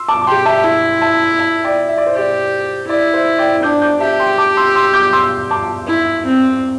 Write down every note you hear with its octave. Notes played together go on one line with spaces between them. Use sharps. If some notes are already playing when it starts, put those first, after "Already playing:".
Already playing: C6 E6
A5 D6
D6
G4 G5 C6
E5 A5
E4
E5 A5
E5 A5
D5 G5
E5
D5
C5
G4 D5
E4 D5
C5 E5
D5 G5
D4 D6 G6
D6 G6
G4 E5 A5
G5 C6
A5 D6
C6 E6
C6 E6
D6 G6
C6 E6
A5 D6
E4
C4